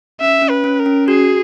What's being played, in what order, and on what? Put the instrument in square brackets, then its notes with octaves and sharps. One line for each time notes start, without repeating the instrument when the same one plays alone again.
[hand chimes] C#4 [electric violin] E5
[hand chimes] C#4
[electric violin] B4
[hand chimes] C#4
[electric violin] A#4
[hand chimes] C#4
[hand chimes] F#4 [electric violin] G#4